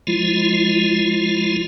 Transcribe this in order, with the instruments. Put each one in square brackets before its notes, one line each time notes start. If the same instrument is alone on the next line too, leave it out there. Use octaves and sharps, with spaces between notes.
[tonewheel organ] F3 G#3 E4 F4